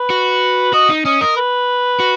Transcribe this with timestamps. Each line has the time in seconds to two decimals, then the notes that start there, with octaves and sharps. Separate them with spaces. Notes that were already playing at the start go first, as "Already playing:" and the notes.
Already playing: B4
0.10 F#4
0.73 F#4 D#5
0.90 D#4
1.05 C#4 D#5
1.21 A#4 D#5
1.36 B4
2.00 F#4